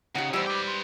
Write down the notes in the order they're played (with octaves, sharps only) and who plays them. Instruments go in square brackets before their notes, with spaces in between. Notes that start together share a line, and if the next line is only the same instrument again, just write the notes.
[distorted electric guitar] C#3 [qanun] D#4 G4 [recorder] F#5
[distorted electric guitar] E2 [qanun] G3 C5 [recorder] E6
[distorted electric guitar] B4 G5 [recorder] D6
[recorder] C6